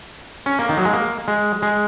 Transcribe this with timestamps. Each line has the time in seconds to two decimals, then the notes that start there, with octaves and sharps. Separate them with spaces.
0.46 C#4
0.59 A#3
0.69 D#3
0.77 F#3
0.85 G#3
0.93 A#3
1.28 G#3
1.62 G#3